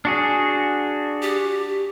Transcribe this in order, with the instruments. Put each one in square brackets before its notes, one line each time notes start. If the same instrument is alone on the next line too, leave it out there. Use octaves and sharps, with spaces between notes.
[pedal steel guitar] D4 F#4 G#4
[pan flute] G4